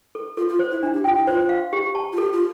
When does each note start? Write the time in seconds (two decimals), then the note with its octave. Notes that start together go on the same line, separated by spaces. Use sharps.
0.15 A4
0.37 F4 A4
0.49 F4
0.59 C5
0.71 E4
0.83 D4 E4
0.93 G4
1.04 F4 G5
1.16 E4
1.27 F4 C5
1.49 F5
1.73 G4
1.95 A5
2.12 F4
2.18 G4 A4
2.33 F4